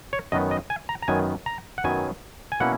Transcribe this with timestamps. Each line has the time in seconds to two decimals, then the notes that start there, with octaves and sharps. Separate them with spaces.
0.13 C#5
0.32 F#2 D#3 F#3 B3 D#5
0.51 D#5
0.70 G#5
0.89 A#5
1.02 A#5
1.08 F#2 D#3 F#3 B3 G#5
1.46 A#5
1.78 F#5
1.84 F#2 D#3 F#3 B3 G#5
2.52 G#5
2.60 B2 A#3 C#4 E4 F#5